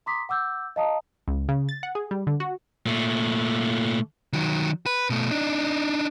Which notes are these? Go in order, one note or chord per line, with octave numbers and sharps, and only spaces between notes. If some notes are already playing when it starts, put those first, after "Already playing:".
A#5 C6 D6 D#6 B6
F#5 D6 E6 G6
D#5 F5 A5 A#5 D#6
C#2
C#3
A6
F#5
G#4
G3
D3
F#4
A#2 A3
D#3 F#3
B4
B2 A3
D4 D#4